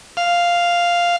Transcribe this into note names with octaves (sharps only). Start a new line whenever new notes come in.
F5